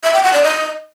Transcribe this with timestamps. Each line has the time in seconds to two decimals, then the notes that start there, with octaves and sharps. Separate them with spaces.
0.04 E5
0.13 G5
0.23 F#5
0.33 D5
0.43 D#5